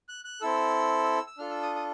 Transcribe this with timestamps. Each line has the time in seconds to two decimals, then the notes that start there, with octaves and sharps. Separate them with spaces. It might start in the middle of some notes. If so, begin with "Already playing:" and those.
0.09 F#6
0.25 F#6
0.41 C4 E4 A4 E6
1.27 E6
1.38 D4 F4 A4 F6
1.51 E6
1.62 D#6
1.75 D#6